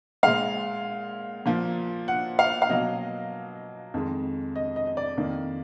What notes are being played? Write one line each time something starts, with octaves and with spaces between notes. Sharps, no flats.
A#2 G#3 F5
A#2 F3 A#3
F#5
F5
F5
B2 F#3 A#3 D#5
F2 D#3 G#3
D#5
D#5
D#5
D5
F2 D#3 A#3